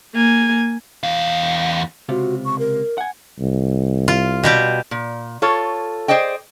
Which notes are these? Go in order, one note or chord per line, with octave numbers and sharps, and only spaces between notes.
A#3 G#5
E2 F5
C#2 C3 F4 F#4
C#6
A#4
F#5 G#5
C2
F4
B2 G3 G4
A#2
F4 A4 C#5
G#4 C5 D5 D#5 G5